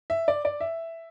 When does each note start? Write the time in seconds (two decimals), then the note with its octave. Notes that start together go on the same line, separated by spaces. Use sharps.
0.10 E5
0.28 D5
0.45 D5
0.61 E5